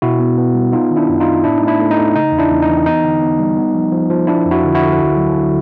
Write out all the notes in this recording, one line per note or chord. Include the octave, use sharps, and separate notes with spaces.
B2 E4 F#4
B3
B3
G3
B3 D#4 F4
D#3
D4 E4
F#2
D#4 F4
B3
A2 D4 E4
A3 D#4
D4 E4
A3
D#4
A3
C#3 D#4
E2
D4 E4
E2
D#4
E3
B3 D#4
D3
B3
G3
B3
F3
F3
F3
F3 D4 E4
F2
E4 F#4
D3
E4 F#4
D3
D2
F#3
D3